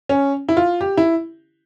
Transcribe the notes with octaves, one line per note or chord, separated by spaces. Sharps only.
C#4
E4
F4
G4
E4